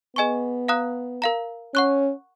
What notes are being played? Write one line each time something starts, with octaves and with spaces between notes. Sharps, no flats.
B3 G#4 D#5 G#5 C#6
F5 A#5 D#6 F#6
A#4 F5 A#5
C#4 F#5 C#6 F#6